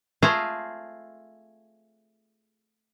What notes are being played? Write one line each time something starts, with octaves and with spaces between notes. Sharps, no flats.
A3 F4 G#4 C5 G#5 A#5